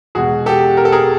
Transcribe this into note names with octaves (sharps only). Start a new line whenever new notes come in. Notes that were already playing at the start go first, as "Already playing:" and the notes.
E2 B2 G#3 F#4 G#4
G4 A4
A#4
A4
G#4 A#4